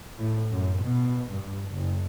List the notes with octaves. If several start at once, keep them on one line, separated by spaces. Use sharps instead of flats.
A2
F#2
B2
G2
F#1